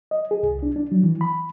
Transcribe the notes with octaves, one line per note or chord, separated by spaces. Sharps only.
D#5
G#4
C2
D4
D4
F#3
E3
B5